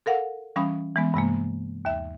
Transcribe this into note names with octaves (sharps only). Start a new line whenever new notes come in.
A4 A#4 F5 F#5
E3 G3 C#4 F5 B5 D#6
E3 G#3 B3
G2 C3 G#3 A#3
D#2 E5